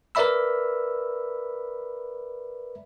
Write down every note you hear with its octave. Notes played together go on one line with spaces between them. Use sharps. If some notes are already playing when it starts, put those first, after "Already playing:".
A#4 B4 D5 E5 B5 E6